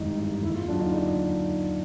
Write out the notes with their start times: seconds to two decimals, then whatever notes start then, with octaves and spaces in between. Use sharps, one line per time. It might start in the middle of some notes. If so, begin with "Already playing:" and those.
Already playing: G#1 G2 E3 D#4
0.17 G2 E3
0.42 D#2 E4
0.55 F4
0.68 D3 F#3 D4
0.80 D#4
0.94 D#4